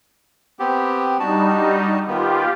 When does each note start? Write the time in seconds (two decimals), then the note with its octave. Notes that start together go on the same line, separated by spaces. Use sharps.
0.59 B3 C4 G4
1.20 G3 D4 D#4 F#4 A5
2.07 D#2 D#3 B3 F4 G4